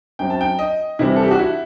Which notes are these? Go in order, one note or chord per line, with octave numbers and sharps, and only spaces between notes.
F#2 F#3 C4 G5
A5
G5
D#5
C3 E3 G3 C4 E4
A4
G4
F#4
E4